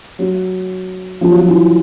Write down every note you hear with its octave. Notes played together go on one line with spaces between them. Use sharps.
F#3
F3
F#3
F3
E3